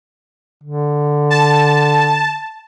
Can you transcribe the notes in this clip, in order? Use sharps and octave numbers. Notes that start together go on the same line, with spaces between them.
D3
A5